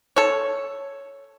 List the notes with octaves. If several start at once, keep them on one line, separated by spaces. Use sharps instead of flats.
A4 C#5